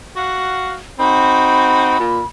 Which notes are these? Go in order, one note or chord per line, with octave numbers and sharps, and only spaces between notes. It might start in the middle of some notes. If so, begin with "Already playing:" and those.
F#4 F5 F#5
C4 D#4 F#4 B5
A#2